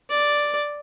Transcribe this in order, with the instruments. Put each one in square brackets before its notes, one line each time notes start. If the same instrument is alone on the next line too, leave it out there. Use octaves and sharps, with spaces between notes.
[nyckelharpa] D5